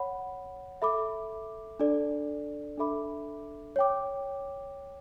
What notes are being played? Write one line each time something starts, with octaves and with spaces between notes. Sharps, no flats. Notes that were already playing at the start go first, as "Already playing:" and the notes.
Already playing: C#5 F#5 B5
A4 E5 B5 D6
D4 A4 D5
D4 A4 E5 B5 D6
C#5 G5 D6